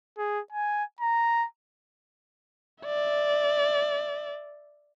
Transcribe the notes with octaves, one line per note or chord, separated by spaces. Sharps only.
G#4
G#5
A#5
D5 E5